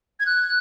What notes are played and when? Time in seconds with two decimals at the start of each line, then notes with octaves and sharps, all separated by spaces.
0.20 G#6
0.26 F#6